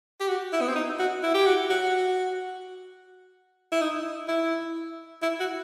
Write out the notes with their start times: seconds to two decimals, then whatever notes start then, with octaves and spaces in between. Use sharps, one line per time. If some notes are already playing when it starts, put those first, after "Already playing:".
0.20 G4
0.28 F#4
0.53 E4
0.61 B3
0.69 C4
0.76 D#4
0.99 F#4
1.23 E4
1.34 G4
1.46 F#4
1.70 F#4
3.72 E4
3.81 D#4
4.28 E4
5.22 E4
5.40 F#4